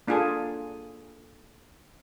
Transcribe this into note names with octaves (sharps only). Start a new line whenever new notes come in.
A#3 D4 F4 G#4 A4